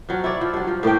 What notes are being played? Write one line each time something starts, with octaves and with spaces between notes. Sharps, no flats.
F3 F#3
E4 C#5 D5
F3
G2 F#3
F3
A2 A#3 G4 G5